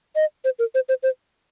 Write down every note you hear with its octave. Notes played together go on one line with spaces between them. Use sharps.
D#5
C5
A#4
C5
C5
C5